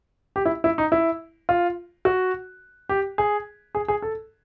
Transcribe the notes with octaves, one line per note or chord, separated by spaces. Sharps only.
G4
E4
E4
D#4
E4
F4
F#4
G4
G#4
G#4
G#4
A4